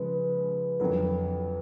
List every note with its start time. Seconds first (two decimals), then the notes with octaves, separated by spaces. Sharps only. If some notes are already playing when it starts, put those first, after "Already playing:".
Already playing: C#3 F3 G#3 B4
0.80 F2 D3 F#3 B4